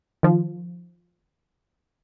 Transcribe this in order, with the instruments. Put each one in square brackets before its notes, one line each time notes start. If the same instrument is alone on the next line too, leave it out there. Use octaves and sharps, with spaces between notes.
[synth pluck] D#3 F3 F4